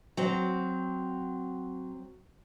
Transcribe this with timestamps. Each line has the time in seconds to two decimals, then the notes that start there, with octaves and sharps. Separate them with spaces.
0.17 F#3 C4